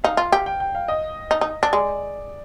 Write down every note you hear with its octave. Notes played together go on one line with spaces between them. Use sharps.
D#4 F5
F4
G4
G5
G5
F5
D#5
D#4
D#4
D4
G#3 D5